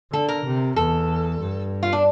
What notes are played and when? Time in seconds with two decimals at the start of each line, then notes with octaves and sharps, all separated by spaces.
0.12 D3 A4
0.28 A#4
0.45 C3
0.76 E2 A4
1.40 G2
1.83 F4
1.93 D4